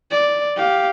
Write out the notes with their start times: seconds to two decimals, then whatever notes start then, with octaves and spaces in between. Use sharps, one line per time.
0.11 D5
0.57 G4 F5